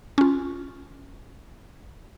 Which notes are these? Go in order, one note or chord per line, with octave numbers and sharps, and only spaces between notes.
C#4 F4